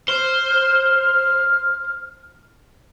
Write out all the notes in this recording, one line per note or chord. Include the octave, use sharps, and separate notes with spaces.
C5 F6